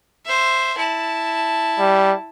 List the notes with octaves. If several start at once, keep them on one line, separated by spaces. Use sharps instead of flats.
C5 E5
E4 A5
G3